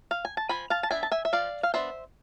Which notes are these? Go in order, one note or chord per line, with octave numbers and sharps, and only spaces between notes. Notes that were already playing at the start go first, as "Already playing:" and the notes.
F5
G#5
A5
F3 G#5 B5
F5 A5
A5
B3 D4 E5 G#5
A5
E5 G#5
E5
F3 D5 F5
F5
B3 D4 C5 E5